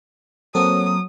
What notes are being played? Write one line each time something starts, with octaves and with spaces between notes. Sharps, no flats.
F#3 A#3 C4 A4 D#6